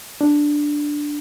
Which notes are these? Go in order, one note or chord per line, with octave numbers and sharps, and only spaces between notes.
D4